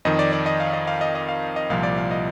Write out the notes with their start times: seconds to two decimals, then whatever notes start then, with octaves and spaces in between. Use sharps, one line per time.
0.05 F2 D#3 D#5
0.19 D5
0.32 D5
0.46 D#5
0.60 F5
0.74 D#5
0.87 F5
1.01 D#5
1.15 D#5
1.28 F5
1.56 D#5
1.70 C2 A#2 F3 F5
1.83 D5
1.98 F5
2.11 D#5